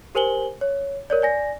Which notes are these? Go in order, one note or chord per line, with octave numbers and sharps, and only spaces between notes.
G4 A#4 C5 G#5 F#7 G7
C#5
A#4 C#5 D5
D5 G#5 A#6